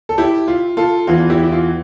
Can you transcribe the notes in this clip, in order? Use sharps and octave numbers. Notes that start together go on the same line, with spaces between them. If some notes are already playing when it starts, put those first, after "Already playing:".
A4
E4 G4
F4
F4 A4
E2 E3 F4
E4 G4
E4
F4